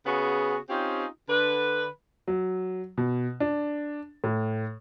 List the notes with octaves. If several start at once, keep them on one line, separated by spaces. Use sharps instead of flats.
C#3 B3 F#4 G#4
C4 C#4 D#4 F4 G4
D3 B4
F#3
B2
D4
A2